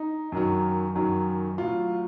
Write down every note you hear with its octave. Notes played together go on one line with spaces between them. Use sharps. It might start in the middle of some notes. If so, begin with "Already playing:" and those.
Already playing: D#4
F#2 D#3 F#3
F#2 D#3 F#3
A2 F#3 F4